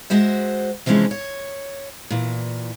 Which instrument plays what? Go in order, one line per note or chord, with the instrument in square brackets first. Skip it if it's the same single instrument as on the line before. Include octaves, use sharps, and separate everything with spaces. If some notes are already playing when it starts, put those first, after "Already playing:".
[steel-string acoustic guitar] G#3 F#4 C5 E5
C3 E3 F3 G#3 C#4 D#4
C#5
A#2 E3